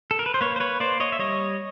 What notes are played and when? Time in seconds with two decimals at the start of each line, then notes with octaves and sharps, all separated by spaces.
0.11 A4
0.19 A#4
0.26 B4
0.34 C5
0.41 A#3 B4 C#5
0.56 C5
0.60 B4 C#5
0.80 A#3 C5 D5
1.00 C#5 D#5
1.12 E5
1.19 G3 C#5 D#5